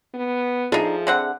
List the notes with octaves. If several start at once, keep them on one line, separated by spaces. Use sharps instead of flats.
B3
F3 D4 D#4 G#4 E5
D3 C4 F#5